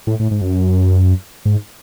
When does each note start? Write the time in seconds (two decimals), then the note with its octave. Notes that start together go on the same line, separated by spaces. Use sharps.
0.07 A2
0.20 A2
0.31 G#2
0.41 F#2
1.45 G#2